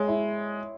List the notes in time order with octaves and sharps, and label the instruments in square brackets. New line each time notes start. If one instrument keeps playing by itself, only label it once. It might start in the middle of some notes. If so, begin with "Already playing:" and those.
Already playing: [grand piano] G#3 [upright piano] C#5 E5
[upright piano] E4